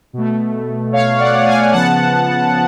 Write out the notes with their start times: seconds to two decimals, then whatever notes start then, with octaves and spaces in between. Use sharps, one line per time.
0.13 B2 A3
0.93 C#5 F5
1.19 D5 F#5
1.37 F#5
1.46 F5 G#5
1.72 C#3 F3 B3 F#5 A5